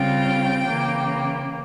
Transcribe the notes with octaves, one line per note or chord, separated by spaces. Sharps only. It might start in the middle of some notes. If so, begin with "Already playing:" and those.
Already playing: C#3 G3 C4 F4 G5
C#3 E3 A#3